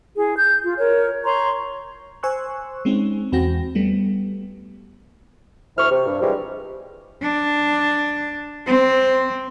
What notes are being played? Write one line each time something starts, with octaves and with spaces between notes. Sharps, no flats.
E4 G#4
G6
F4
A#4 C#5
C#5 A#5 C6 C#6
C5 G#5 C6 C#6 E6 F#6
G#3 C4 C#4 D#4
E2 C4 F#4 G5 A#6
G3 A3 B3
D2 E3 C5 E5 C#6 F6
C3
G2
G2 C3 E3 F3 G3 G#3
D4
C4